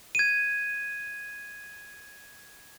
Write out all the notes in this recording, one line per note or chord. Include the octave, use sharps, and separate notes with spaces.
G#6 D#7